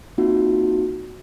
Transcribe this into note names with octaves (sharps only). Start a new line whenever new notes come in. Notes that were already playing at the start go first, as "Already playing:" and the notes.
A#3 C4 D#4 F4 F#4